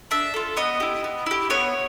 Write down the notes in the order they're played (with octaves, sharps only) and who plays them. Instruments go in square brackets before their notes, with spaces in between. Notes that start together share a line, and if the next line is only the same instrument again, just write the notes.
[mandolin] D4 E5
F4 A4
B3 D#5
E4 G4
B3
E4 G4
B3 C#5